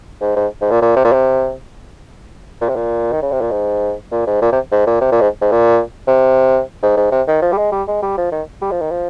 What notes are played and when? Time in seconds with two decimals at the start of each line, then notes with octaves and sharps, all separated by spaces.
0.21 G#2
0.36 G#2
0.62 G#2
0.71 A#2
0.82 A#2
0.96 C3
1.04 A#2
1.13 C3
2.61 A#2
2.69 C3
2.76 A#2
3.12 D#3
3.22 C#3
3.32 C3
3.41 A#2
3.51 G#2
4.12 A#2
4.27 G#2
4.42 A#2
4.52 C3
4.72 G#2
4.86 A#2
5.01 C3
5.12 A#2
5.21 G#2
5.42 G#2
5.52 A#2
6.07 C3
6.82 G#2
6.97 G#2
7.12 C3
7.27 D#3
7.42 F3
7.52 G3
7.58 G#3
7.72 G3
7.87 G#3
8.02 G3
8.18 F3
8.32 D#3
8.62 G3
8.71 F3
8.81 D#3
8.91 F3